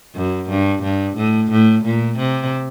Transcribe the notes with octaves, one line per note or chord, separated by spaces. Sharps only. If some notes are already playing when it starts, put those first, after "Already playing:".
F#2
G2
G2
A2
A2
A#2
C3